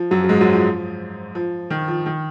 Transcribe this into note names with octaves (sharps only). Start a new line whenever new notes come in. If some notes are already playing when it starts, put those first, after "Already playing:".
Already playing: F3
F#2 F#3
F#3
G#2 G#3
F#2 F#3
F3
F3
D#3
F3
D#3